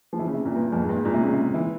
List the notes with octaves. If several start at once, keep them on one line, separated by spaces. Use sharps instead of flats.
F3
E3
C#3
C3
A#2
G2
F2
G#2
G2
G#2
A#2
C3
C#3
C3
E3